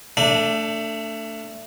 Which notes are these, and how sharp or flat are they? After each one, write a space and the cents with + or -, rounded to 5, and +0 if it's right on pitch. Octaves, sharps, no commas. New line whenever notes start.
A3 +20 D4 -10